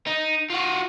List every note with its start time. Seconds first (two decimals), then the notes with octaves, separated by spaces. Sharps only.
0.07 D#4
0.50 F4 F#4